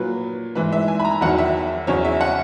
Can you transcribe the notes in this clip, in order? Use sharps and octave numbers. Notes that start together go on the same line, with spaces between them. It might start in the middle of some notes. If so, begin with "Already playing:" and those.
Already playing: A#2 F#3 B4
G#2 E3 B4
E5
G#5
B5
A#5
E2 D#3 F#3 F#5
E5
E2 C#3 F#3 C#5
E5
F#5